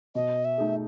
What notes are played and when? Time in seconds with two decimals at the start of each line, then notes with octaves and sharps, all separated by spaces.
0.15 B2 D#5
0.45 E5
0.58 A3 D#4 G#4